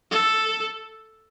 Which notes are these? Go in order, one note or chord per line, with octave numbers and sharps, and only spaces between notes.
A4